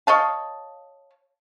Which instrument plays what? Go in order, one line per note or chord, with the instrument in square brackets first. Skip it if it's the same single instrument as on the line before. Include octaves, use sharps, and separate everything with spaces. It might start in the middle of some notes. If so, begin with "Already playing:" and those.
[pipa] C#5 D#5 F5 A5